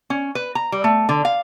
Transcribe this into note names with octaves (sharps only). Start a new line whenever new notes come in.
C#4
B4
A#5
G3
A3
D3
F5